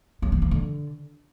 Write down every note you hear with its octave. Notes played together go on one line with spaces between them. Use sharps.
F#3
D#3
F3
D3